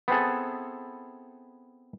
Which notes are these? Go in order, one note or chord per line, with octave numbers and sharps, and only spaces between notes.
B3 C4 E4 G#4 A4